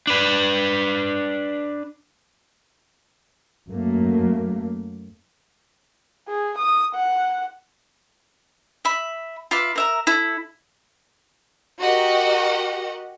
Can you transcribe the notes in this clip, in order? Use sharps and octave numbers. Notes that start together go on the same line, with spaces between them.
D4 B4
F#2 F#3 A3 A#3
G#4
D#6
F#5
E5 B5
F4 B4 E5 D6
A#4 E5 A#5
E4 A4
F#4 G4 A#4 D#5 F#5